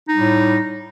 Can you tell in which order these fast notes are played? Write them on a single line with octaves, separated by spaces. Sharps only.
D#4 G3 A2